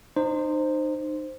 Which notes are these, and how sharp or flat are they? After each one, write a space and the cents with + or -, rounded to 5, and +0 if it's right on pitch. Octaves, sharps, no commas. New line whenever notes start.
D#4 -30 C5 +0